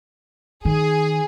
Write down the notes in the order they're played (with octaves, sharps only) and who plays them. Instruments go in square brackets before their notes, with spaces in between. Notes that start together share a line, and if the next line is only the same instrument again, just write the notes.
[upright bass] D#3 [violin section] G#4